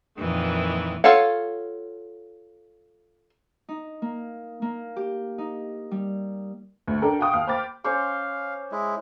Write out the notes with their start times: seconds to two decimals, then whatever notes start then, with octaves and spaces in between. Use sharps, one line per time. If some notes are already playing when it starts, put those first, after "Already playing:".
0.18 F2 A#2 D#3 E3
1.04 F4 A4 C#5 F5 F#5
3.69 D#4
4.02 A#3
4.62 A#3
4.96 G4
5.38 D#4
5.91 G3
6.87 D2
7.02 D4 A4 A#4 G5
7.19 F#4 F5 G5 C#6 D#6
7.33 D#2 F5 F6
7.47 C5 G5 B5 D6 F6 A6
7.84 C#4 C5 F5 C#6 D6
8.72 G#3 E4